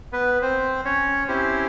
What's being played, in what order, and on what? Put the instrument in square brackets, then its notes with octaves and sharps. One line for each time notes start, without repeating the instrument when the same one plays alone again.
[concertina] B3 B4
C4 C5
C#4 C#5
C4 C#4 E4 G4 C5